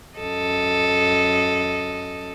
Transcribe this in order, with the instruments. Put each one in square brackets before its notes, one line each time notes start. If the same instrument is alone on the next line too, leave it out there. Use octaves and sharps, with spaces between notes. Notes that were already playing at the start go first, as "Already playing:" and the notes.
[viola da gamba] F#2 A4 D#5